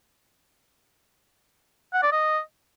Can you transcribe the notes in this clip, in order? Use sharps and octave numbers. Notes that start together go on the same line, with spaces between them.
F#5
D5
D#5